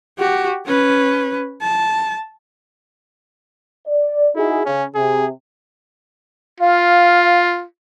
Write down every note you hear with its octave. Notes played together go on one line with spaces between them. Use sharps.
F#4 G4
C#4 B4
A5
D5
D#4 E4 F#4 G#4
C#3 C#4
C3 G#4
F4 F5